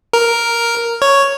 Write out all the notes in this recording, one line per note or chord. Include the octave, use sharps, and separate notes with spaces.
A#4
C#5